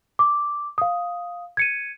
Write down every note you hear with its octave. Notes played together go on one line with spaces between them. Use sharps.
D6
F5 D#6
G#6 C#7 D#7